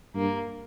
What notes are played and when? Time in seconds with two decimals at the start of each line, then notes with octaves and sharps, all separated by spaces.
0.15 G2 A#3